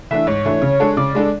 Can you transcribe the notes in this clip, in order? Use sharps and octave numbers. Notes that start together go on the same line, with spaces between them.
E3 A3 D4 E5
G#2 C#5
E3 A3 D4
C#3
G#3 D4 A4
C#3 D5
G#3 D4 A4